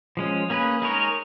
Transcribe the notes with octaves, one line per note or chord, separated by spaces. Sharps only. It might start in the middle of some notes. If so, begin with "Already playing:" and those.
F3 G#3 C#4
A#3 C#4 G#4 B4
G#3 D#4 A#4 C#5